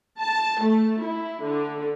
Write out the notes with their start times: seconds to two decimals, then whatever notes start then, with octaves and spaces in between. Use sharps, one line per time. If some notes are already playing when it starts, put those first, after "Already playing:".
0.22 A5
0.62 A3
1.05 E4
1.43 D3